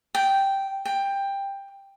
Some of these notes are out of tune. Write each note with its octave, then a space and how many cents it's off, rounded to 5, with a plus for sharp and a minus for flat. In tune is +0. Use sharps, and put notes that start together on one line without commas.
G5 -5
G5 +15